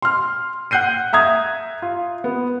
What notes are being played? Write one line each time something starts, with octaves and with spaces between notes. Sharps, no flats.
C6 F6
F#5 F#6 G6 C7 D#7
E5 A#5 D#6 G#6
F4
B3